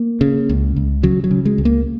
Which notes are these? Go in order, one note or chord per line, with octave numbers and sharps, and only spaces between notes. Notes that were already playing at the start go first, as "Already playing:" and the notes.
Already playing: A#3
C#3
C#2
C#2
C#3 F#3
F#3
C#3
G#3
C#2
A#3